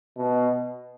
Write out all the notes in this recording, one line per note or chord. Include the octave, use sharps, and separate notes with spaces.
B2